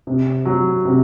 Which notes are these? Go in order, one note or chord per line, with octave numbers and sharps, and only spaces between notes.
C3
F#3
C3